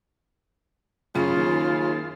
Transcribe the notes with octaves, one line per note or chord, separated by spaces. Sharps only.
F#2 C#3 C#4 F4
D#2